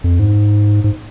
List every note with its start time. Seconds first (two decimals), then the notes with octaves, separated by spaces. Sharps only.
0.04 F2
0.19 G#2
0.84 G#2